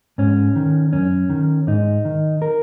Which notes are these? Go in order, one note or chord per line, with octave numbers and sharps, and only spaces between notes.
G#2 C#4
D#3
F#2 C#4
D#3
G#2 D#4
D#3
A#4